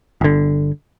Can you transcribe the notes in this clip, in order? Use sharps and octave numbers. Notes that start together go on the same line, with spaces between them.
G1 D3